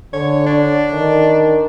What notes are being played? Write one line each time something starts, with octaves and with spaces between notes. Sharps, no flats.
D3 C#5
D4
D#3